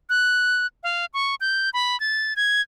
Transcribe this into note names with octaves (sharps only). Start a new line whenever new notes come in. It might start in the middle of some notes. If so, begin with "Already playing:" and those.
F#6
F5
C#6
G6
B5
A6
G#6